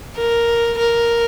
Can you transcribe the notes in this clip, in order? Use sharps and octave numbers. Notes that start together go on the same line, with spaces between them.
A#4
A#4